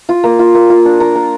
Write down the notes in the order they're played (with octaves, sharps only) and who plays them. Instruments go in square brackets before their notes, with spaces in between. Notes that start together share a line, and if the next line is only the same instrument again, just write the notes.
[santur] F4
A#3
F4
A#3
F4
D4
A#4
A#4